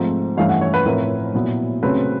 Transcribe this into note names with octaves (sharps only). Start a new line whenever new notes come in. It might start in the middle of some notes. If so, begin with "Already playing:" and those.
Already playing: G#2 F3 A3 C4
G2 E3 A3 C#4 E4 F5
F#5
C#5
B4
A2 F3 A3 C4 E4 A#4
A#2 F#3 B3 E4
C#3 F#3 A3 C4 B4